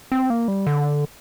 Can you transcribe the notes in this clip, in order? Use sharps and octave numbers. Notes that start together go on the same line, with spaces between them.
C4
A#3
G3
D3